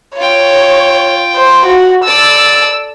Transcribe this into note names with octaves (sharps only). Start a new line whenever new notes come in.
F4 C#5 G5
C5
F#4
A4 D5 E6